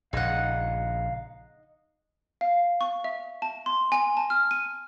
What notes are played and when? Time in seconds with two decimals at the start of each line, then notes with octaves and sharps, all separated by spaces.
0.13 A#1 C#3 D#4 F5 F#5
2.41 F5
2.81 C#6
3.04 E5
3.42 A5
3.66 C6
3.92 G#5
4.17 A5
4.30 F6
4.51 D#7